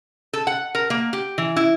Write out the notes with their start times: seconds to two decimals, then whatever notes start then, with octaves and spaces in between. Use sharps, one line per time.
0.33 A4
0.47 F#5
0.75 A#4
0.90 A#3
1.13 G4
1.38 E3
1.56 E4